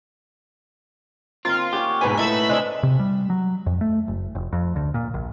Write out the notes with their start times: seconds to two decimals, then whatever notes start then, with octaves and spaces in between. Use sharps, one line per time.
1.45 A#2 D#3 C4 F4 A#5
1.73 C#4 G4 C#5 F#5
2.01 G#2 B2 D#4 B4 G#5 B6
2.17 A2 A3 D#4 A4 B4 E5 B5 E6
2.49 G#3 C4 D4
2.83 C3
3.00 G3
3.30 F#3
3.66 F2
3.81 A3
4.08 F#1
4.35 F1
4.53 F2
4.76 D2
4.94 A#2
5.14 A#1